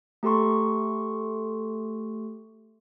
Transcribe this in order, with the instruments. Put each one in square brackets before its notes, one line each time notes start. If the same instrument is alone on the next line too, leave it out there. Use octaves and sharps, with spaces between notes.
[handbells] A3 G4 A4 C6 C#6